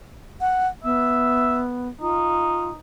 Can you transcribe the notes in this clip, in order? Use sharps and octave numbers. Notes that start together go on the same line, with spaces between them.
F#5
B3 E5
D#4 F4